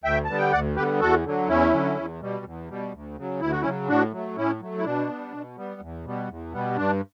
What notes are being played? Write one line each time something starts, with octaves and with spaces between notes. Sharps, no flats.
D2 E5 G5
D3 G3 B3 A5
G5
D2 D5 F#5
D3 G3 B3 G4 B4
E2 F#4 A4
D3 F#3
E2 C#4 E4
D3 F#3
E2
B2 G3
E2
B2 G3
D2
C#3 F#3
D2 E4
F#4
C#3 F#3 C#4 E4
A2 D4 F#4
F#3 A3
A2 C#4 E4
F#3 A3
E4
B2 D4
G3 B3
B2
G3 B3
E2
B2 G3 B3
E2
B2 G3 B3
G2 D4